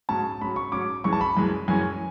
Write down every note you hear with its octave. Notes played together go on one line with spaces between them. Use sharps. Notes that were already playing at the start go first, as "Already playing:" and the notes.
G#2 F#3 C#4 A5
G#2 F#3 C#4 B5
C#6
G#2 F#3 C#4 D6
F#2 E3 G#3 C#4 C#6
A5
B5
F#2 E3 G#3 C#4
F#2 E3 G#3 C#4 G#5